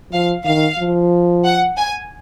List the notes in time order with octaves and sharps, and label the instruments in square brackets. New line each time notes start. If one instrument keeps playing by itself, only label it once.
[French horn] F3 [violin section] F5
[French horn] D#3 [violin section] F5
[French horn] F3
[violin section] F#5
G#5